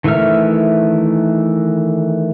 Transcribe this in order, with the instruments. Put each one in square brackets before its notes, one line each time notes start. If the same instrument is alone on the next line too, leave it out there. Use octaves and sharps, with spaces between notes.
[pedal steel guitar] D#3 E3 A3 E5 F6